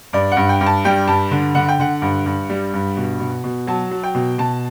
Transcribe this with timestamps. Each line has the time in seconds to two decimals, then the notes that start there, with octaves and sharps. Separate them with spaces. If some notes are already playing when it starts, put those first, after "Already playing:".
0.13 G2 D5
0.32 G2 F#5
0.49 G5
0.61 G2
0.66 A5
0.85 G3 G5
1.08 G2 A5
1.31 D3
1.55 D3 F#5
1.68 G5
1.79 D3 F#5
2.02 G2
2.26 G2
2.50 G3
2.73 G2
2.97 B2
3.20 B2
3.44 B2
3.67 F#3 A5
3.91 F#3
4.03 G5
4.15 B2
4.38 B2 A5